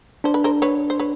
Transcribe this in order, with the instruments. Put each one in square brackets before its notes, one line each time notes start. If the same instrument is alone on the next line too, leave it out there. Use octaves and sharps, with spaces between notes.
[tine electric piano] D4 [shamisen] C5
[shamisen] B4
A#4 C5
B4 C#5
C5
B4 C#5